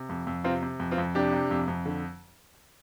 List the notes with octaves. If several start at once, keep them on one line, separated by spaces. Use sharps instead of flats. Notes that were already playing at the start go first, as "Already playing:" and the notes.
Already playing: C3
F2
F2
C3 C4 F4
C3
F2
C4 F4
F2
C3 D4 G4
C3
F2
F2
D3